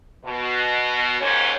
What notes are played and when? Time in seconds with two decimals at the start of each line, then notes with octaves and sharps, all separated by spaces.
0.24 B2
1.20 D#2 G#2 C#4 C#5